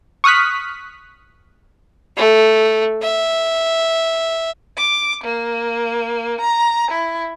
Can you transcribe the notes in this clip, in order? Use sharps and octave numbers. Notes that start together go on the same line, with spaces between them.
C#6 D#6 F6 F#6 B6
A3
E5
D6
A#3
A#5
E4